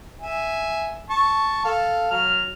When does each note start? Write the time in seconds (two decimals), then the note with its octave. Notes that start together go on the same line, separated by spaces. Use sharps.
0.22 E5 G#5
1.10 A5 C#6
1.65 A4 F5
2.11 F#3 F6